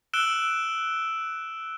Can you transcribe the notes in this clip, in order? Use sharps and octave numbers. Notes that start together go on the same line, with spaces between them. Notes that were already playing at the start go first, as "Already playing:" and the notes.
E6 F#6 D7 E7 G7